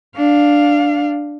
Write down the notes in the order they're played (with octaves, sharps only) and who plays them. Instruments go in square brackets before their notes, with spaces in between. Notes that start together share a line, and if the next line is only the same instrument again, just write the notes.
[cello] D4 F5